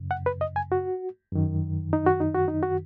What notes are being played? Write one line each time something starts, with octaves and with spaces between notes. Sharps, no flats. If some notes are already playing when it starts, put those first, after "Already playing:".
Already playing: F#2 C#3
F#5
B4
D#5
G#5
F#4
F#2 D#3
D#4
F#4
D#4
F#4
D#4
F#4